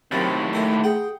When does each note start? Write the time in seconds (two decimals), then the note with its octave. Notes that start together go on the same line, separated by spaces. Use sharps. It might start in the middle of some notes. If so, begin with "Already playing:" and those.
0.12 D#2 A2 C3 F#3 A#3 C4
0.53 G#3 A3 A#4 E5
0.84 G#4 F#5 G5